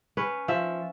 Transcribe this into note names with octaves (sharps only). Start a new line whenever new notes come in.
C#4 B4
F3 E5